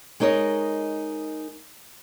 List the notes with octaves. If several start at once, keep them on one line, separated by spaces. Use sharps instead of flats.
G#3 D#4 A#4 C#5 D#5